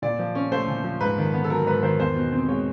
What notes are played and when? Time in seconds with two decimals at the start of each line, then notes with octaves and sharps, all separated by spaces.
0.02 A#2 D5
0.19 F3
0.35 C#4
0.52 A3 C5
0.68 A#2
0.84 F3
1.01 G#2 B4
1.18 D#3
1.34 B3
1.44 A4
1.50 F#3 A#4
1.66 G#2 B4
1.83 D#3 C5
2.00 E2 C5
2.16 B2
2.32 C4
2.48 G#3 C#5